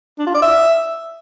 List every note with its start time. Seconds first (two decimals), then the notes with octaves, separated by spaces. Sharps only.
0.19 D4
0.27 F4
0.34 D5
0.42 E5